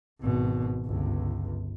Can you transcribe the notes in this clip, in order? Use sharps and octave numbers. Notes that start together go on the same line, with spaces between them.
G#1 B2
G1 C#2